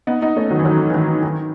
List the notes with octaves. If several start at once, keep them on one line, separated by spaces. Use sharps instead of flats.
B3 D#4
B3 D#4
A3 C#4
D#3 F#3
E3
D#3 F#3
E3
D#3
D#3